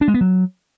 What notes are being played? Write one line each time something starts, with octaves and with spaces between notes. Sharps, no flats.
D4
G#3
B3
F#3